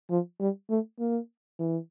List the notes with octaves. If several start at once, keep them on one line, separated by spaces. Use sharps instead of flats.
F3
G3
A3
A#3
E3